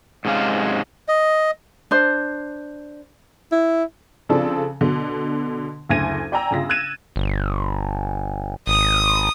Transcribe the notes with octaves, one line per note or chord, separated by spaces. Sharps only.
G#2 C3 G#3 C#4 F5
D#5
D4 C5
E4
C#3 F3 C4 D4 A4 A5
B2 D3
F#1 D2 G#5 G#6 A#6 D#7
D5 G5 G#5 A#5 E6
G1 C#3 F4 A#6
E6 F#6 G#6 A6 D#7 E7
G1
G#1 D#6